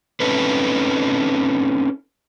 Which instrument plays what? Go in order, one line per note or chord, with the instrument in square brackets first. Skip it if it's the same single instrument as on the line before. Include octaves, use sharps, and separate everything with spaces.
[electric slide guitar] C4 C#4 D#4 A4 B4